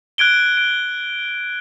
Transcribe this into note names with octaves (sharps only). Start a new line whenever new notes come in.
F#6 G#6 D7 G7
D7